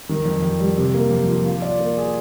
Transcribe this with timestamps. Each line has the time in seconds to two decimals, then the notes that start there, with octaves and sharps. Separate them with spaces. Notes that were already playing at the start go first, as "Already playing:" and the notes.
0.09 D#3
0.25 F2
0.43 F2
0.60 G3
0.78 C3
0.94 A#3
1.11 F2
1.28 F3
1.46 F4
1.62 D5
1.80 A#3
1.97 G#4